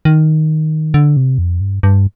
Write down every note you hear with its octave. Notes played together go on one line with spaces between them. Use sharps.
D#3
D3
C3
F2
G2
G2